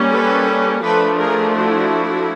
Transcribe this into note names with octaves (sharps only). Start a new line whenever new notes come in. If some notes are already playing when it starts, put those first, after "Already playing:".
Already playing: G3 A#3 C#4
A4 B4
F3 A3 D4 A4 B4
G#4 A#4
E4 F#4